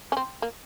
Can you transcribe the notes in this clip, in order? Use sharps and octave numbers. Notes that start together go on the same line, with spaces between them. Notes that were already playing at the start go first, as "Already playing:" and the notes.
C#4
C4
A#3